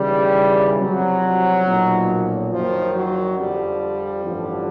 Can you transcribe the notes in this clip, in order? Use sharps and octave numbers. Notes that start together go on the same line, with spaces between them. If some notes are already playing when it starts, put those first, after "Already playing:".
Already playing: D#2 C#3 E3 G3
C2 C3 F3 F#3
B1 A#2 F3
F#1 F#2 D#3 F3
F#3
F2 D3 F3 G3
A1 G2 D3 F3